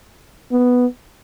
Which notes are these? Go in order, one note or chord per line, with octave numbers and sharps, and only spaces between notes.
B3